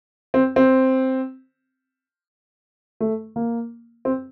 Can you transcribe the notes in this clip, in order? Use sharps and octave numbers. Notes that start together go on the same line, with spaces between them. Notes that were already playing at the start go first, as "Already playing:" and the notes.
C4
C4
A3
A#3
C4